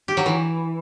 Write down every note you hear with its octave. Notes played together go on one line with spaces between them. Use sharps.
G4
F#3
E3